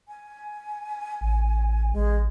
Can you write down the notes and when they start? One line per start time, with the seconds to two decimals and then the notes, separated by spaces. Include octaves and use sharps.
0.08 G#5
1.21 A1
1.93 A1 G#3